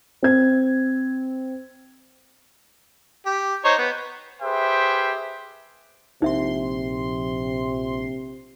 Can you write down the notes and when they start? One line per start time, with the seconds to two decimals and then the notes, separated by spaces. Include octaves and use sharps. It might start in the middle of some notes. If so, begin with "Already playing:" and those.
0.23 C4 G#6
3.26 G4
3.64 D#4 C5 C#5
3.78 B3
4.42 G4 G#4 B4 C5 E5 G5
6.22 A#1 C3 D#4 E5 C6